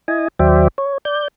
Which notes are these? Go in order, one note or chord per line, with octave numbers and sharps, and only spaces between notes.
E4 D#5 G#5
D#2 F#3 C5 D5 E5 G5
C#5
D5 G6